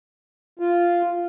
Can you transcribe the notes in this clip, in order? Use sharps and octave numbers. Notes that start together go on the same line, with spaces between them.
F4